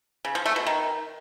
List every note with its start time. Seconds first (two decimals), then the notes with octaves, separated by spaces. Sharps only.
0.25 C#3
0.35 F3
0.46 A3
0.56 B2
0.66 D#3